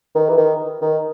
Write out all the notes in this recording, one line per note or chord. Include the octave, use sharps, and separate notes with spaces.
D#3
E3
D#3
D#3